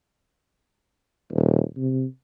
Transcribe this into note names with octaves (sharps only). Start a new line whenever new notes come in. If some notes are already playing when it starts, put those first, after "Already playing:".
D#1
C3